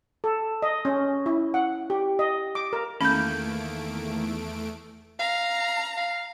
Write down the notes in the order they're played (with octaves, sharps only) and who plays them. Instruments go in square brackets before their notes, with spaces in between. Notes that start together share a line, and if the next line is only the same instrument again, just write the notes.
[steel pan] A4
D#5
C#4
E4
F#5
G4
D#5
D6
A#4
[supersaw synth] E2 A3 D7 [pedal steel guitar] D#3 A#3 [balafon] C#4 [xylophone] B5 G6
[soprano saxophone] F5 [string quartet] A#5
[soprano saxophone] F5